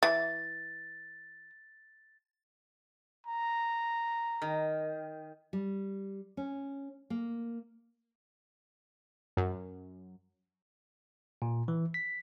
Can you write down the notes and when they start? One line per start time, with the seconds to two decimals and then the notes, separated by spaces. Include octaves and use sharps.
0.03 E3 A6
3.27 A#5
4.42 D#3
5.53 G3
6.37 C#4
7.10 A#3
9.37 F#2
11.42 A#2
11.68 E3
11.94 B6